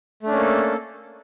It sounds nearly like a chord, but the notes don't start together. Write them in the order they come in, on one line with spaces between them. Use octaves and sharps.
A3 D4 C#4 A#3 A4